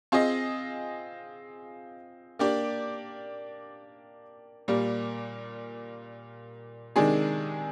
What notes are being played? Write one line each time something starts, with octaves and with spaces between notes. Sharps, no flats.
C4 F4 G#4 D#5
A#3 D4 G4 D5
A#2 G3 A#3
C3 D#3 G#3 D4 G#4